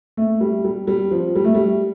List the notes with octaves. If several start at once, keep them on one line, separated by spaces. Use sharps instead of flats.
A3
G3
G3
G3
F3
G3
A3
G3